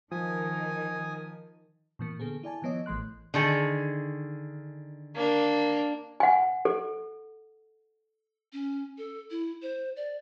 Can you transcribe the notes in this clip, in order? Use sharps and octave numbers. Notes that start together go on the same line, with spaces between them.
D#3 F3 G#5 D#6
A#2 E3 A#3
D3 B3 G#4 A4
E4 D5 G#5 A5
D#3 F3 B3 C#5 D#5
A1 E3 A3 C6 F#6
D3 D#3 G#4
A#3 D4
F#5 G#5
A4
C#4
A4
E4
C5
D5